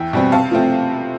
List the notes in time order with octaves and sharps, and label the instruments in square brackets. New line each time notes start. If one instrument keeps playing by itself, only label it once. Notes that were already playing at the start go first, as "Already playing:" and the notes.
Already playing: [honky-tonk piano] E2 E5 G5
B2 G3 C4
C3 F5 A5
F3 A3 C4